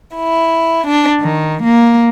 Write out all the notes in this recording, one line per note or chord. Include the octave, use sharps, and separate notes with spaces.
E4
D4
D#3
A#3